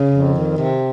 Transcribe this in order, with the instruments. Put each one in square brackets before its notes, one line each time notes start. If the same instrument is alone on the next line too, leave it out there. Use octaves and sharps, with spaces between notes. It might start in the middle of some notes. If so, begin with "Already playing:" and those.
Already playing: [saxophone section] C#3
F2
D#3
C3